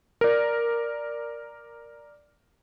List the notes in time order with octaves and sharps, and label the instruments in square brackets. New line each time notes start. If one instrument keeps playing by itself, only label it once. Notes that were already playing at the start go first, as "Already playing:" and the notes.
[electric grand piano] A#4 D5